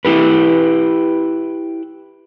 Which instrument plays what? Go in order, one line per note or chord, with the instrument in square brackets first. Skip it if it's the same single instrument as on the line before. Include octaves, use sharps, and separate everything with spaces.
[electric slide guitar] E4 G4 B4